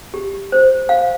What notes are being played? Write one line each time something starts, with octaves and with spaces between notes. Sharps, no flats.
G4
C5
F5